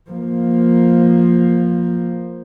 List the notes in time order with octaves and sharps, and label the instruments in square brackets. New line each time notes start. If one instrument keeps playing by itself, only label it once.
[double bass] F3 A#3